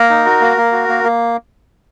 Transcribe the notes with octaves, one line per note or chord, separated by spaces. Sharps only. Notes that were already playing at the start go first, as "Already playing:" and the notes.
Already playing: A#3 A#4
D#4
F#4
A#3
A#3
F#4
A#3
A#3